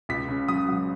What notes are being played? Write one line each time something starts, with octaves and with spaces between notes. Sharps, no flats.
C#2 B6
C#3
F#3 D#6
F#3